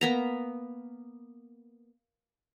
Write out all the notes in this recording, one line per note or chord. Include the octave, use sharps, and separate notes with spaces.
A#3 B3 A#5